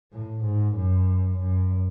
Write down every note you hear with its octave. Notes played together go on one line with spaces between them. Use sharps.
A2
G#2
F#2
F#2